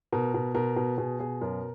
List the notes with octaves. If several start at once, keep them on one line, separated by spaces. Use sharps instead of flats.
B2 A#4
B2
B2 A#4
B2
B2 G#4
B2 G#4
F#2 A#4